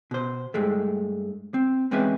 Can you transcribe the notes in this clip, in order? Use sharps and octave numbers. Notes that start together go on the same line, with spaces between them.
B2 C5
G2 G#3 A3
C4
E2 G#3 C4 C#4 B4 E5